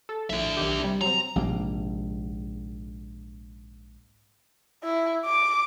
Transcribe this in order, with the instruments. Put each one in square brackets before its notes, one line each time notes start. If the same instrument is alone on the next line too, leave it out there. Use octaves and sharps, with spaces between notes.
[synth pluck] A4
[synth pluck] A#1 A2 [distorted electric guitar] D4 E5
[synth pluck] B1 D#3 G4
C3 G3
[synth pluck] F#3 C4 [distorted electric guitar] A#5
[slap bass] A#1 G#2 C3 A#3
[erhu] E4
D6